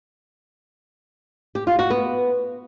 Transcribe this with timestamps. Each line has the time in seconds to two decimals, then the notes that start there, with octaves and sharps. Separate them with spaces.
1.55 G4
1.67 F4
1.79 F#4
1.90 B3